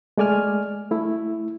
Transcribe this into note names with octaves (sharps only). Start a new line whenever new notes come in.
G#3 A3 D5 G#5 F6
A3 E4